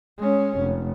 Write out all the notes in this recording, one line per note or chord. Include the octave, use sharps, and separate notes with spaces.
G#3 C#4
F1